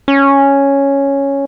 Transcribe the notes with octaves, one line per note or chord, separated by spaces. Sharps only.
C#4